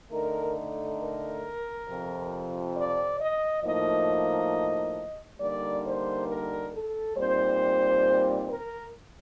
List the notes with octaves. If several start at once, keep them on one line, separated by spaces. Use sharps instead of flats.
D3 A3 D#4 A#4
A4
A#4
F2 C3 F3
D5
D#5
A2 F3 A#3 D#4 D#5
D3 G3 A#3 D#4 D5
C5
A#4
A4
A#2 G3 C4 D#4 C5
A#4